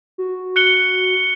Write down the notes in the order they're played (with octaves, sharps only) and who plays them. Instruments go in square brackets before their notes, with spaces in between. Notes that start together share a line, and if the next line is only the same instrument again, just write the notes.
[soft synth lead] F#4
[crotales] F#6 C#7 G7